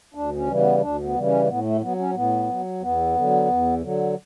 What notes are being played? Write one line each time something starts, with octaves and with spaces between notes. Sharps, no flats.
D2 D4
C#4
C#3 E3 G3
B3
D2 D4
B3
C#3 E3 G3
C#4
A2 B3
A3
F#3 B3
C#4
A2 B3
F#3
E2 B3
D3 F#3
E2
D3 F#3